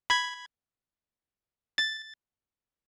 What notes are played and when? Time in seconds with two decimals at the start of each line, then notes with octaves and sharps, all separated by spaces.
0.10 B5 G#6
1.78 A6